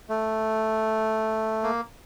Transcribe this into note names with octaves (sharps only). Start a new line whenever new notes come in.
A3
A#3